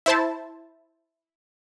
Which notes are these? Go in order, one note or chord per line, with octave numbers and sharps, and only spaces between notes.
E4 C5 A5